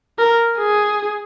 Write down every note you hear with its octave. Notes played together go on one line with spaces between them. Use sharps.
A#4
G#4